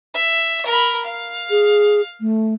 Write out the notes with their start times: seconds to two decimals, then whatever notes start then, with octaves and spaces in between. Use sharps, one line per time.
0.14 E5
0.66 A#4 B5
1.05 F5
1.51 G#4
2.21 A3